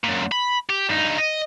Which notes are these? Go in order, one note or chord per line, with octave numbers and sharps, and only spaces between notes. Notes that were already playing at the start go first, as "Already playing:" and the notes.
F#2 A#2
B5
G4
G2 D#4
D#5